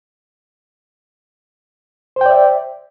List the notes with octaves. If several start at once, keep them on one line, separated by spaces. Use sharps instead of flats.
C5 D5 E5 G5